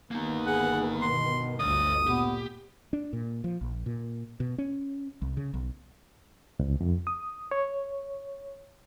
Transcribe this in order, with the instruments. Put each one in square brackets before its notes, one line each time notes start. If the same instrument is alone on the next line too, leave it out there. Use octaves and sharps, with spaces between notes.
[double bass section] G1 D#3 B3 [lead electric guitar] A#3 D#4
[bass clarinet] G#4 [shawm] F#5
[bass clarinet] B2 [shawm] C6
[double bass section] G1 D2 D3 [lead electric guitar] C#5 D#5 [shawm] D#6
[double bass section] A#2 [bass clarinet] B3 [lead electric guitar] G4
[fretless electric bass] D4
A#2
F3
A#1
A#2
B2
C#4
C2
C#3
B1
[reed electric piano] C#2
F2
D#6
C#5